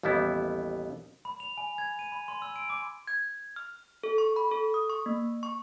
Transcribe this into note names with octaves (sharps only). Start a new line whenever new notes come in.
A1 D#2 G3 B3 E4
B5
F7
G#5
G#6
D#7
B5
C6
E6
D7
D6
G#6
F6
A4
C#6
B5
A4
D#6
C#6
A#3
C#6